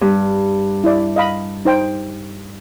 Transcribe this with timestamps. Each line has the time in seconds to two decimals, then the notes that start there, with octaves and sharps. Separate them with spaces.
0.01 G2
0.84 E4 D5
1.16 D#5 F5 B5
1.65 D#4 C5 G5